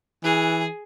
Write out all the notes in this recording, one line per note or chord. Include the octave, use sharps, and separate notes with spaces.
E3 G#4